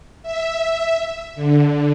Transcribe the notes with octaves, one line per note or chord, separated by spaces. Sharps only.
E5
D3